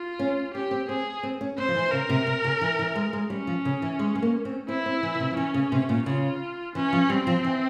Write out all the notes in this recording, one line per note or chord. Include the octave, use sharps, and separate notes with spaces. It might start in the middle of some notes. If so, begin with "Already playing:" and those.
Already playing: F4
C#4
C#4 G4
C4
C4 G#4
C4
C#4
C4 C5
F3
E3
C#3 A#4
C3
C3
C#3
E3
E3
G#3
G#3
G3 C#4
F3
C#3
E3
G#3
G#3
A#3
C4
C4 E4
C4
E3
C#3
C3
F3
E3 C#4
C#3
C3
A#2
C#3 F4
E3 C#4
F3
G3 C4
F3
E3